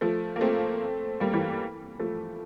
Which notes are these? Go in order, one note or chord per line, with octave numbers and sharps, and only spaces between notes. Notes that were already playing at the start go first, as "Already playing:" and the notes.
F3 A3
A#3
A3 C4
G3 A#3
E3 G3
F3 A3